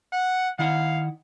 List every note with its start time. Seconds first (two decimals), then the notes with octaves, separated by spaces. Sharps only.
0.12 F#5
0.59 D#3 E4 F5 F#5